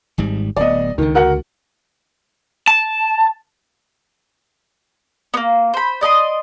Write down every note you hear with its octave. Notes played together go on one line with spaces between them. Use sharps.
G#1 G#2 G3
D1 B3 D5 D#5
C#2 D3 D#3
F#4 A#4 F#5
A5
A#3 B3
C5 B5
D5 D#5 A#5 C6